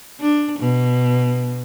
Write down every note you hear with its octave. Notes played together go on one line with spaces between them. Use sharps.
D4
B2